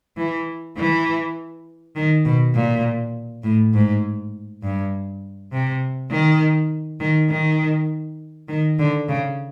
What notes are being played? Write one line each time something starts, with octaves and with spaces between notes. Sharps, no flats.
E3
E3
D#3
B2
A#2
A2
G#2
G2
C3
D#3
D#3
D#3
D#3
D3
C#3